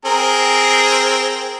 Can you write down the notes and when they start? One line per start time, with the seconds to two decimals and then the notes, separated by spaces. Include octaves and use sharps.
0.05 C4 G#4 A#4